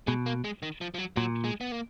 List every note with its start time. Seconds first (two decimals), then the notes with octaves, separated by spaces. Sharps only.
0.07 B2 G#3
0.26 A#3
0.44 G#3
0.62 D#3
0.81 F3
0.94 F3
0.98 F#3
1.16 A#2 F#3
1.44 G#3
1.61 B3
1.72 A#3